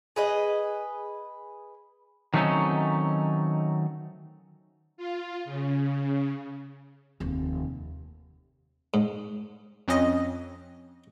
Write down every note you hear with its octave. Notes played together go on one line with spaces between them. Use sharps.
G#4 B4 D#5
D#3 F#3 A3 C4 C#4 D#4
F4
C#3
F1 D#2
G#2
F2 C#4 D#5